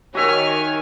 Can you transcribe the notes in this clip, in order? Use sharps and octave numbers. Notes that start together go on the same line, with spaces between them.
D#3 F#4 G4 C#5 E5 G#5 F6